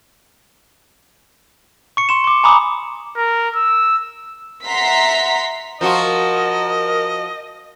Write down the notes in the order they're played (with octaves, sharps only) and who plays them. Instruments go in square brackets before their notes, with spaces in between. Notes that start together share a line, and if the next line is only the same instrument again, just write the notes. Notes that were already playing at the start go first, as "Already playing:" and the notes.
[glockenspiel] C#6 C#7
C6 E7
C6 D6
G#5 A#5 B5 D6 D#6
[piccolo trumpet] A#4
E6
[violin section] E5 F#5 A#5 C6 B6
[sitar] F3 F4 F#4 [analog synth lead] A#4 [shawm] D#5